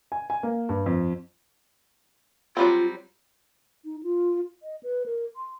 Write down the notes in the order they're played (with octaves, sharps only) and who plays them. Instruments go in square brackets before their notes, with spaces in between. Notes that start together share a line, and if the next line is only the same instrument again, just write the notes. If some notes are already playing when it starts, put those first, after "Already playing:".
[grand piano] G#5
G#5
A#3
G2
F2
[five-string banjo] F#3 G3 C4 [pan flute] F4
[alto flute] D#4
F4
D#5
B4
A#4
C6